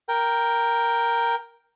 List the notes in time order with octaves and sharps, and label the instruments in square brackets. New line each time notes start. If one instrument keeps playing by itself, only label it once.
[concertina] A#4 G5